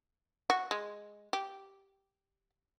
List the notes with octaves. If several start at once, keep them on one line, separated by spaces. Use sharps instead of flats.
F#4
G#3
G4